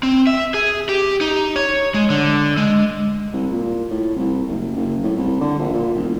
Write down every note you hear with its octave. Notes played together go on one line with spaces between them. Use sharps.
C4
E5
G#4
G4
D#4
C#5
G#3
D3
G#3
C2
A#2
A2
C2
F#1
F#1
A2
C2
D3
A#1
A#2
E1